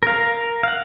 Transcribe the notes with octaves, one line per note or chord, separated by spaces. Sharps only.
A#4 F5
F5 F#5